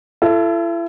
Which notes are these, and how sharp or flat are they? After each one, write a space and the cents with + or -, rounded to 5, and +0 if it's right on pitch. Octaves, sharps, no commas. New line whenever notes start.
E4 +40 A4 +0